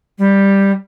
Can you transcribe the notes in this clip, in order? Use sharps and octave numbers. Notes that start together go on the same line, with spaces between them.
G3